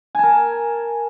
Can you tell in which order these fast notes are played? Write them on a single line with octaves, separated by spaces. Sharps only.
G#5 A5 A#4